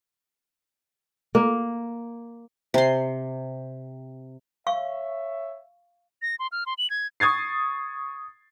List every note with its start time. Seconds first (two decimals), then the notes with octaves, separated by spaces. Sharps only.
1.35 A#3
2.74 C3 C6
4.67 C#5 E5 F5 C#6
6.22 A#6
6.39 C6
6.52 F6
6.66 C6
6.78 F#7
6.90 G#6
7.20 C#6 D#6 G#6 A6 C7